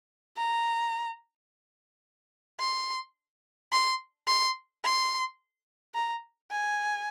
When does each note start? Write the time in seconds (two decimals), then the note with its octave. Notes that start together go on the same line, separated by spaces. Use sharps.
0.37 A#5
2.60 C6
3.72 C6
4.27 C6
4.84 C6
5.94 A#5
6.51 G#5